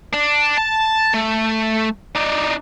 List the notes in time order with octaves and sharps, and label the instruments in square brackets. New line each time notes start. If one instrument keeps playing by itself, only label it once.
[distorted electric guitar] D4
A5
A3
D4 D#4